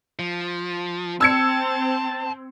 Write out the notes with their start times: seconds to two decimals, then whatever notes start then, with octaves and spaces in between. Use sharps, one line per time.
0.19 F3
1.21 C4 A5 E6 G#6 C#7